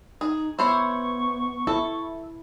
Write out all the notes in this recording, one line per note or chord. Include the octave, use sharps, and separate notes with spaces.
D#4 G#4
B3 E4 C5 C#5 C#6
E4 A4